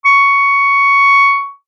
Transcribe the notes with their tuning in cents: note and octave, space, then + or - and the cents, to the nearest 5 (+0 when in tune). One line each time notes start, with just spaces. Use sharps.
C#6 +10